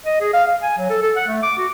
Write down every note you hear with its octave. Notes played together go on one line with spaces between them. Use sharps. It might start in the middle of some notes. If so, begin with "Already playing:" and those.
D#5
G#4
F5
F5
G#5
F#3
A4
A4
F#5
A3
D6
F#4